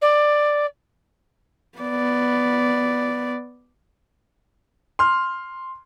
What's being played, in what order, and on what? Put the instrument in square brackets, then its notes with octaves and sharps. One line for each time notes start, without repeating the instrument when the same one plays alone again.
[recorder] D5
[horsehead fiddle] B3 D5
[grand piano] C6 F6